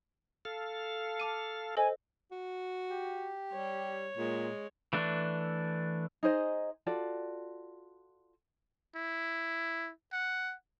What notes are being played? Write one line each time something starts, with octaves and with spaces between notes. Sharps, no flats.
A4 F5
A5 D6 D#7
A4 C5 D#5 G#5
F#4
G4
G3 C#5
A#2 G#3
E3 A3 D4
D#4 G#4 C5 D#5
F4 F#4 A4 D5
E4
F#5